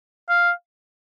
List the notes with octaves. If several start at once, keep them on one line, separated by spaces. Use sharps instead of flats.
F5